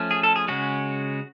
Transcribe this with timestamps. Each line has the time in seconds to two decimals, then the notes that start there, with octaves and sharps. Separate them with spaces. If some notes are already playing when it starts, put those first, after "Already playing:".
Already playing: F3 A3 C#4
0.11 G#4
0.23 A4
0.36 G#4
0.48 C#3 G#3 C#4 F#4